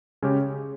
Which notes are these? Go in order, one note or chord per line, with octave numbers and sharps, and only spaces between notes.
C#3 G#3 C#4 G4 C#5